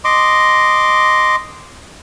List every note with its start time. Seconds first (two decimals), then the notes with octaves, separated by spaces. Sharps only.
0.05 D#5 C6 D6